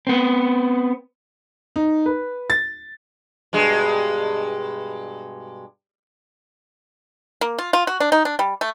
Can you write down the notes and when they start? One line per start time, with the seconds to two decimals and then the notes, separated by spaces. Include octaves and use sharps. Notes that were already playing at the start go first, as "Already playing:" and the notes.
0.07 B3 C4
1.76 D#4
2.06 B4
2.50 A6
3.53 G2 B2 G#3
7.41 A#3
7.58 F4
7.73 F4
7.87 F#4
8.00 D4
8.12 D#4
8.25 D4
8.39 G3
8.61 A3